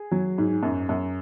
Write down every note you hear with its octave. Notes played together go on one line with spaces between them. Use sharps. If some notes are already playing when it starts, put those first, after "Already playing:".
Already playing: G#4
F#3
G#2
F#2
F#2